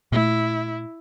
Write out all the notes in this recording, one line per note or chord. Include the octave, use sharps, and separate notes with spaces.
A#2 A3 E4